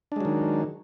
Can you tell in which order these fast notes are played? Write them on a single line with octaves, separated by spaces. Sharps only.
D4 G#3 F#3 D#3